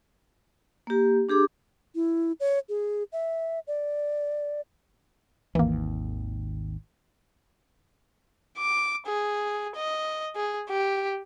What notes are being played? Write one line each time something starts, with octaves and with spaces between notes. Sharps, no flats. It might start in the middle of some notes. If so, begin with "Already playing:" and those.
A#3 G4
D4 G4 G#4 D6
E4
C#5
G#4
E5
D5
G#1 D#2 E3 A#3
D6
G#4
D#5
G#4
G4